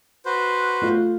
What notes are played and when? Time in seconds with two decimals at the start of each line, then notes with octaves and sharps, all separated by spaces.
0.26 F#4 B4 C5
0.82 A3 F4